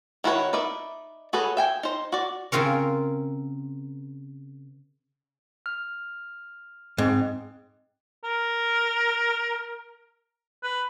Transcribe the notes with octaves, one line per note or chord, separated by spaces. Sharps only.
D#3 E4 F#4 B4 C#5
D#4 B4 D5 E5
F#4 G#4 A4 B4 C#5
E5 G5 G#5
D#4 C5
F#4 D5
C#3 C4 F4 A#4 C#5
F6
G#2 C4
A#4
B4